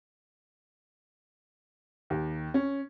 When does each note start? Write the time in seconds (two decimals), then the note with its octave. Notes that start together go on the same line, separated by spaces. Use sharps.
2.10 D#2
2.54 C#4